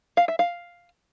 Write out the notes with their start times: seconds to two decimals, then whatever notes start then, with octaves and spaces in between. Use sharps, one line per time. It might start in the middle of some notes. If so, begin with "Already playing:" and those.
0.17 F5
0.28 E5
0.39 F5